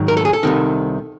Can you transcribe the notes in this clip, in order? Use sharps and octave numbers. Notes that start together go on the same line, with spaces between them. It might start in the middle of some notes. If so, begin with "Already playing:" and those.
Already playing: G#2 D#3 F#3
A#4
A4
G#4
A4
C2 C3 D#3